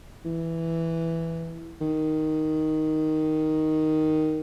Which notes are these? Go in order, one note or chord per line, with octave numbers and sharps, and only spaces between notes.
E3
D#3